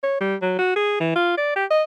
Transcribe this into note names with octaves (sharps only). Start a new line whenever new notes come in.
C#5
G3
F#3
F#4
G#4
E3
F4
D5
G4
D#5